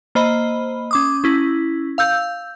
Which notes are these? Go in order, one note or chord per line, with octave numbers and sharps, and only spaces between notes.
A#3 C5 D#5 B5
C#4 D6 D#6
C#4 E4
F5 E6 G6